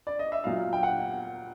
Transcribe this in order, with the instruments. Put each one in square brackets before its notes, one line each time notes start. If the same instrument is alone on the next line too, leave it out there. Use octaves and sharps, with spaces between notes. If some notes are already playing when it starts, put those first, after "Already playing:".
[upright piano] D5
D#5
E5
A#2 F#3 F5
G5
F#5